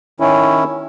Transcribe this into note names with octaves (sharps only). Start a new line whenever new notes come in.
D#3 C#4 E4